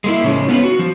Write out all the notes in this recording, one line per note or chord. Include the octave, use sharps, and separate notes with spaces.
G#3 A#3 E4
A2 C#3 F3 G#3
B3 C#4 D4 F4 B4
F#4
F3